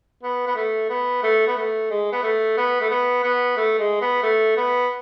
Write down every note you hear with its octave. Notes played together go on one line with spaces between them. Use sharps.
B3
B3
A3
B3
A3
B3
A3
G#3
B3
A3
B3
A3
B3
B3
A3
G#3
B3
A3
B3